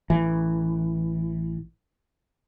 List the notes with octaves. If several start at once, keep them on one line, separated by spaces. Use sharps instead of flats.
A1 E3